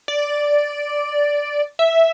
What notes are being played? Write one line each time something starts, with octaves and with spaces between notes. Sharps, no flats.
D5
E5